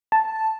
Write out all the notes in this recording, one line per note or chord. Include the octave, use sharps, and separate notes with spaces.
A5